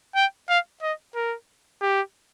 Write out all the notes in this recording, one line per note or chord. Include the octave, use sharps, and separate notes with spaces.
G5
F5
D#5
A#4
G4